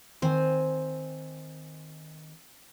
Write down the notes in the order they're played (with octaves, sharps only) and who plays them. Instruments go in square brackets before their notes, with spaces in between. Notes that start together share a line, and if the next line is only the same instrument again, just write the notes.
[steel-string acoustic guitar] D#3 G#5 [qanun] C4